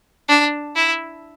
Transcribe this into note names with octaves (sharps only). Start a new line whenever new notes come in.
D4
E4